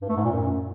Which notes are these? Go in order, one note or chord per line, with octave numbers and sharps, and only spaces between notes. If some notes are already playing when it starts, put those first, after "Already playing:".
G2
A3
G#2
A#2
F#2